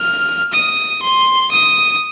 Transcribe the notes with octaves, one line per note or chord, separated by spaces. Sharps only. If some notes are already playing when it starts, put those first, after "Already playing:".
Already playing: F6
D#6
C6
D#6